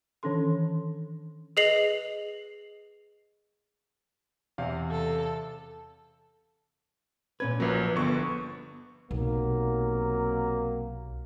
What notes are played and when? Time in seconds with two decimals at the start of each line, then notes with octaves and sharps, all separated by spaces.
0.23 D#3 E3 C#4 D4 A4 C6
1.57 G#4 B4 D#5 C7 F7 F#7
4.58 E2 C3 F5
4.90 A4
7.40 A#2 C#4 B4 G#6
7.60 A#1 F3 F#3 A#3 B4
7.96 G1 D3 B3 C#6
9.11 B1 C3 F#3 A#3